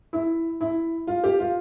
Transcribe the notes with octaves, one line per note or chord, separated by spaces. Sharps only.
E4
E4
F4
G4
F4